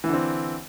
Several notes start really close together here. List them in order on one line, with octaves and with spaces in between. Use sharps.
E3 D3 C4